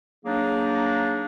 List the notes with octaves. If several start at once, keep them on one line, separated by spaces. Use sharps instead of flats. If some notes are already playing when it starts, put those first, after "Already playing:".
F#3 A#3 D4 D#4 G#4